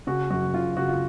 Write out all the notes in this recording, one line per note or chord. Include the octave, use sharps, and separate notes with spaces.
C#3 F#4
F#2 F#4
C#3 F4
C#3 F#4
F4